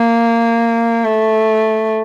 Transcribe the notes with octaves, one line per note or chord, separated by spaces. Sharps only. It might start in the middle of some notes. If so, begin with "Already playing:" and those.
Already playing: A#3
A3